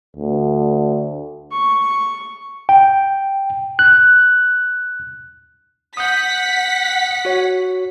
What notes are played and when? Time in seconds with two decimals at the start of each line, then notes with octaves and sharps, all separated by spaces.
0.17 D2
1.52 C#6
2.69 G5
3.79 F#6
5.97 F#5 D#6 G6 B6
7.25 F#4 C#5